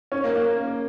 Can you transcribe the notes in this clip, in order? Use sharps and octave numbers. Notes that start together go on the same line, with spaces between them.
C#4
A#3
A#3